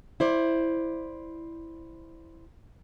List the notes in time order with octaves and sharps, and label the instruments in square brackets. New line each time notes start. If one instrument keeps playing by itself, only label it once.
[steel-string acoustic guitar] E4 C5 D5